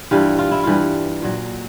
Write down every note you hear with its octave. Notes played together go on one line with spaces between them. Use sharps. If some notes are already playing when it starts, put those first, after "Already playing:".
G2 E3 G3 F4
F4
E4
G2 E3 G3 F4
A#2 F#3